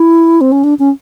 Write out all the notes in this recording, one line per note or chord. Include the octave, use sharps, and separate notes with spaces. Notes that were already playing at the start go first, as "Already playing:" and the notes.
Already playing: E4
C4
C#4
D4
C#4